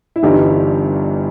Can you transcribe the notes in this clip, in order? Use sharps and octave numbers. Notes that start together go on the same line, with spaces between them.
E4
G1 G2 E3 D#4 G4